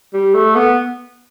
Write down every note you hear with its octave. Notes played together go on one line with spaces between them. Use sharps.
G3
A3
B3